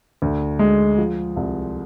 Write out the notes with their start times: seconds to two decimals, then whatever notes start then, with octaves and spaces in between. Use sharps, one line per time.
0.22 D2
0.59 G#3
0.98 F3
1.36 C2